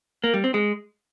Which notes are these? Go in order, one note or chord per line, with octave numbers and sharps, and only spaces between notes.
A#3
G3
C4
G#3